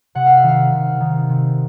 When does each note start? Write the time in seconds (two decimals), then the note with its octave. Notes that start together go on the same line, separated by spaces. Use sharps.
0.15 C3 F#5
0.26 F5
0.37 E5
0.43 D#3 F5
0.72 C3
1.00 D#3
1.29 C3